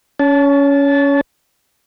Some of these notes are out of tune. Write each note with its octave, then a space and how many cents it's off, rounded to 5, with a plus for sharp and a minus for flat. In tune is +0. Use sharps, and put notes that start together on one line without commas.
C#4 +20 A5 -20